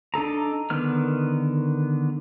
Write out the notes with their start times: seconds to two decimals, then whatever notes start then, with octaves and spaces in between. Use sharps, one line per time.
0.14 D4 D#4 A4 A#5
0.70 D3 D#3 B3 F6